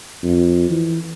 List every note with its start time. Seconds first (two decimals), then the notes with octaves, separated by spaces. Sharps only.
0.23 F2
0.70 E3